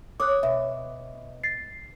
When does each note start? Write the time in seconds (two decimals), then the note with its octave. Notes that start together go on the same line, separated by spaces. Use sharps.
0.20 C#5 D6 D#6 F#6
0.43 B2 E5
1.44 A6 C7